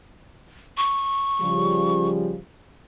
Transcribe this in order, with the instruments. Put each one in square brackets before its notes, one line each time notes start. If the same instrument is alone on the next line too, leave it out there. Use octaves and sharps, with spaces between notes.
[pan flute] C#6
[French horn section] C#3 F3 G3